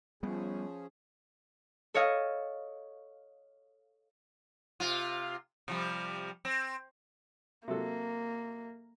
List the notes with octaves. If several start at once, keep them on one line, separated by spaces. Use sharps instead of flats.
F3 G3 B3 C#4 G#4
A4 C#5 D#5 F5
C3 F4
C3 F3 G3
C4
C3 F#3 A#3 A4